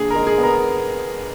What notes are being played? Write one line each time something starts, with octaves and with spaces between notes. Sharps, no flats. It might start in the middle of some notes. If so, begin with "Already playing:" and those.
Already playing: D3 A#3 G#4
A#4
G#3
G#4
B3
A#4